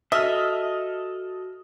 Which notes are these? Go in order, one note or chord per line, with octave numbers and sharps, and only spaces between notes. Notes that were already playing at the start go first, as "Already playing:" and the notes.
F#4 A4 D#5 E5 D#6 F6